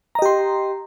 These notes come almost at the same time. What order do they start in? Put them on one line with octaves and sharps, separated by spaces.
A#5 D#5 G4 C6